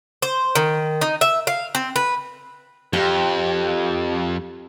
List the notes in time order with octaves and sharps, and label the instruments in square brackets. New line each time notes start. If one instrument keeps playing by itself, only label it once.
[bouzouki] C5
D#3
D#4
E5
F5
C4
B4
[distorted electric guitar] F2 [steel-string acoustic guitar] G4